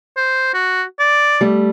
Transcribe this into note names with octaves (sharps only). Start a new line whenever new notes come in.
C5
F#4
D5
G3 A3